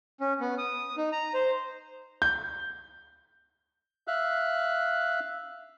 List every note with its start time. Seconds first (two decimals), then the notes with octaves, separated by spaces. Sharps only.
0.21 C#4
0.41 B3
0.58 D#6
0.97 D#4
1.12 A#5
1.34 C5
2.22 G6
4.08 E5 F5 F#6